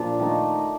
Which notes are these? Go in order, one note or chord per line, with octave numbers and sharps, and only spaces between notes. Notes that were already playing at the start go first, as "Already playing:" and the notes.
Already playing: A#2 F3 D4
D#3 A3 D#4